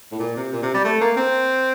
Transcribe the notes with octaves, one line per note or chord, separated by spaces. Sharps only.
A2
A#2
C3
A#2
C3
G3
A3
A#3
C4